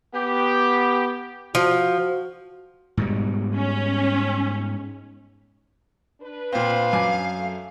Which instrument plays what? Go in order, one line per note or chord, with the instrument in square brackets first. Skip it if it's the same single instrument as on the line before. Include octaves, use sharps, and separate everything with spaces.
[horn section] B3 G4
[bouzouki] F3 [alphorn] F#4
[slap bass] G#2 B2 G3
[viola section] C#4
[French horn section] D4 B4
[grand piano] A#2 C4 [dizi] F5
[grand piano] F#2 G#5 D6
[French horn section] A3